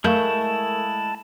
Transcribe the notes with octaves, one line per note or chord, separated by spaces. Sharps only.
G#3 A3 E4 A#4 F5 A5 C#6 G6